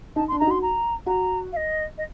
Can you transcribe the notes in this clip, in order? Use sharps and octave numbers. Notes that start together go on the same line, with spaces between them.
D#4 A5
C6
D4
D#4 A#5
F#4 C6
A#5
F#4 A#5
F5
D#5
D#5